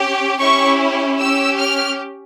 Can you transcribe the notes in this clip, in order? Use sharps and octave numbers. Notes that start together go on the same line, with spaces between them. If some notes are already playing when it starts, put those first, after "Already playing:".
Already playing: C#4 G4
C#4 E4 G4 C#6
C#4 G4 E6
F6